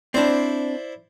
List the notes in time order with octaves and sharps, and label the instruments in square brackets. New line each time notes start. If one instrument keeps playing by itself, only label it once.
[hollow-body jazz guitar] C4 D4 [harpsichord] E4 C5 D5